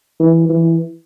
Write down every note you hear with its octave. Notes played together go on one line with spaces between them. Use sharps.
E3
E3